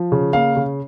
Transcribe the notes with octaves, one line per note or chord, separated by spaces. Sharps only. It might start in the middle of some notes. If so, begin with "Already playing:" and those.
Already playing: F3
C#3
A#3 F5
C#3